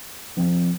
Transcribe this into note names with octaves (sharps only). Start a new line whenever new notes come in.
C3 F3 C4